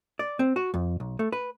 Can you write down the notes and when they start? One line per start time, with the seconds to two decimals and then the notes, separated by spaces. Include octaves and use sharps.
0.19 D5
0.39 C4
0.56 F#4
0.74 F2
1.00 B1
1.19 A3
1.32 B4